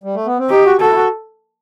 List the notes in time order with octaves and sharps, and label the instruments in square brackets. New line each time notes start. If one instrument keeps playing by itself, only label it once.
[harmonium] G3
A3
B3
C4
[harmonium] D#4 [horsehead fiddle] G4
[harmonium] F#4
[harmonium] F#4 [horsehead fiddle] A4
[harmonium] E4
F#4